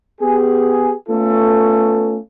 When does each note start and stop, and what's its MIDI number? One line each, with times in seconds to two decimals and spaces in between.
0.21 0.93 59
0.21 0.93 67
0.21 0.93 68
1.09 2.18 57
1.09 2.18 59
1.09 2.18 61
1.09 2.18 65
1.09 2.18 69